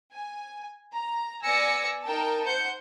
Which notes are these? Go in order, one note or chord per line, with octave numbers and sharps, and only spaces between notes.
G#5
A#5
B3 D5 G#5 E6 A#6 C#7
D#4 A#4 G5 A5
C5 F#5 G6 C#7